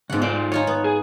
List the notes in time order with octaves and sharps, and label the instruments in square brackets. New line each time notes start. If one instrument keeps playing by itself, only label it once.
[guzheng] G#2 F#5 [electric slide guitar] C#3 B3
[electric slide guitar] F4 A4 D5 [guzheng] C5
[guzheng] D#4 F4 G#4 [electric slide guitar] C#5
[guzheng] B3
[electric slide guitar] G#4